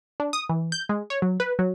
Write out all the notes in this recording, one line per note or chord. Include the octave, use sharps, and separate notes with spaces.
D4
D#6
E3
G6
G#3
C#5
F#3
B4
F#3